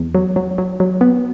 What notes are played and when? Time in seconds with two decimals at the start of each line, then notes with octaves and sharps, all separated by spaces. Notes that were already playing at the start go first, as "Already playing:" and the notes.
Already playing: E2
0.15 F#3
0.36 F#3
0.58 F#3
0.80 F#3
1.01 B3